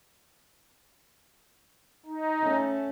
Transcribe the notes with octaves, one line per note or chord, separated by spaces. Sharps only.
D#4
A3 C#4